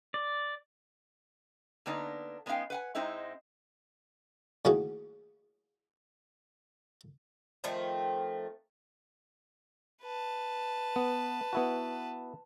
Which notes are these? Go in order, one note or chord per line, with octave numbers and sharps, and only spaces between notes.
D5
D3 A#3 B3 D4 D#4
G#3 B3 C#4 D#4 F5 G5
B4 F#5 G#5
G#2 G#3 C4 D#4 E4
A2 D#3 A#3 C#4 F#4 G#4
D#3 F3 A3 C4
B4 A5
B3
B3 E4 F#4